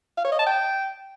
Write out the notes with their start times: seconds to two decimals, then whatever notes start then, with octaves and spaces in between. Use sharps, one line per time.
0.17 F5
0.25 C#5
0.32 D#5
0.39 A5
0.46 G5